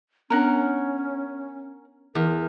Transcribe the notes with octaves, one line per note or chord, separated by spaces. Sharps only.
B3 C#4 D4 A#4 F#5
E2 A#4